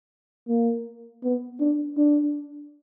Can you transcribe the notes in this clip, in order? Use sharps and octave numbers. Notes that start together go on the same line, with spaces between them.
A#3
B3
D4
D4